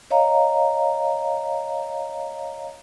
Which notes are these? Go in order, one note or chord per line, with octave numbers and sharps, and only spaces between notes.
C#5 D#5 F5 A#5